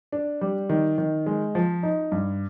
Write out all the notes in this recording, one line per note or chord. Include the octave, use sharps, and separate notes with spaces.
D4
G3
D#3
D#3
G#3
F3
D#4
G2